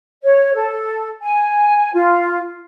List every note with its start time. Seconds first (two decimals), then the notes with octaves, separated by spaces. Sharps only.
0.22 C#5
0.54 A4
1.21 G#5
1.93 F4